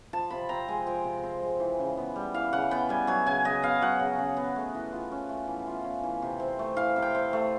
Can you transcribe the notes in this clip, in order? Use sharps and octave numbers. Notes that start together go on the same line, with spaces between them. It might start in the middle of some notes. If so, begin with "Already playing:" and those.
F3 A5
C3 B5
C4 A#5
G#3 G#5
F3 G5
C3
C4
G#3
E3
C#3
B3
G3
E3 F5
C#3 F#5
B3 G5
G3 G#5
F#3 G#5
C#3 G#5
C#3 D#5
B3 F5
F#3 F#5
C#3
C#3
B3
A3
E3
F4
C#4
A3
E3
F4
C#4
E3
C3
C4
A3
E3 F5
C3
G5
C4
A3